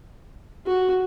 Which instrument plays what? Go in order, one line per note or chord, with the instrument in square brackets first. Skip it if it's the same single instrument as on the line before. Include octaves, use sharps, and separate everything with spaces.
[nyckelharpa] F#4